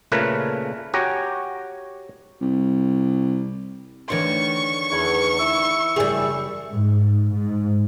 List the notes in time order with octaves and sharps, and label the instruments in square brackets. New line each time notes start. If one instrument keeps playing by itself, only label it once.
[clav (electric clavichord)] A#2 C#3 A3 A#4 B4
F#4 G4 C#5 G5 G#5 A#5
[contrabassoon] C2
[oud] D2 D#3 [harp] E3 C#5 D5 [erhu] C#6
[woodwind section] E2 [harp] A5 B5 G#6
[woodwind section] E4 E6
[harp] F#1 G4 [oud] G3 G#4
[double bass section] G#2
G#2